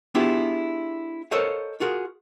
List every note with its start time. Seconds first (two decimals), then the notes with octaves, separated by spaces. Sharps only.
0.15 B3 D4 E4 F4 G4 G#4
1.31 A4 A#4 C5 C#5 D#5 F5
1.80 F4 F#4 G#4 A#4